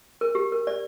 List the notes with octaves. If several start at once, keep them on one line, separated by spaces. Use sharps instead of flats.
A#4
G4
A#4
D5